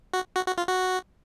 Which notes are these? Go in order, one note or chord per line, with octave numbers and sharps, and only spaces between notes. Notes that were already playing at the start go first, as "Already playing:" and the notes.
F#4
F#4
F#4
F4
F#4